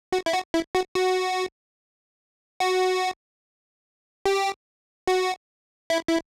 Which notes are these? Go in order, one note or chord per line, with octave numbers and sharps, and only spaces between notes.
F#4
E4
F#4
E4
F#4
F#4
F#4
G4
F#4
E4
E4